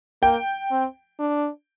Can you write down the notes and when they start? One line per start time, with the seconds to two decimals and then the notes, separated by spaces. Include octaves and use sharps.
0.23 A#3 G5
0.71 C4
1.19 D4